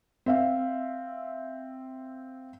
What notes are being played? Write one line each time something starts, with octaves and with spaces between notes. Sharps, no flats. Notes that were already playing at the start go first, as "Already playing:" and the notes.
C4 E5 F5